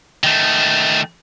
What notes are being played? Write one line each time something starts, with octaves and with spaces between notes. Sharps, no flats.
D#3 A3